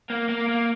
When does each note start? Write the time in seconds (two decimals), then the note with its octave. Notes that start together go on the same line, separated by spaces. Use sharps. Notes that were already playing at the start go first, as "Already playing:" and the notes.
0.10 A#3
0.29 A#3
0.49 A#3